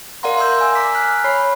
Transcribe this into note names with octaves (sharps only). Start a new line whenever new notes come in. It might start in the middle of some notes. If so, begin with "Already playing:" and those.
A#4 D5 F5 F#5 A#5 C6
E5 A#5 C6 E6 G6
G#5 E6
A#5 D6 B6
G#5 F6 F#6 B6
C#5 B5 C7